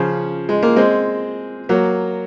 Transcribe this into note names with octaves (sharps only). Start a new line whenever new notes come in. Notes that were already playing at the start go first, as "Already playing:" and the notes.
Already playing: C#3 F3
G#3
A#3
G#3 C4
F#3 A#3